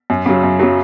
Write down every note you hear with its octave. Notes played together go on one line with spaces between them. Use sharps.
F#2
C#3 F#3
F#2
C#3 F#3